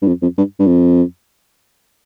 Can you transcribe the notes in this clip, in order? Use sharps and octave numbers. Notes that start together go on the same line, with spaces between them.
G2
F2
F2
G2
G2
F2